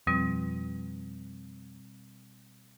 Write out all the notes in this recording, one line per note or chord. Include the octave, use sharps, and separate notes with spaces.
F2 B2 G3 C4